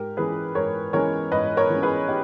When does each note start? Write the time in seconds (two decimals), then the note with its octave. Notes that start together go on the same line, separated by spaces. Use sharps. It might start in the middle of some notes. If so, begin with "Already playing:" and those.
Already playing: G#2 G4 A#4
0.17 E3 G#3 C#4 G#4 B4
0.55 G#2 A#4 C#5
0.93 E3 G#3 C#4 A#4 C#5
1.31 G#2 B4 D#5
1.57 A#4 C#5
1.70 E3 G#3 C#4
1.82 G#4 B4
2.08 D#4 G4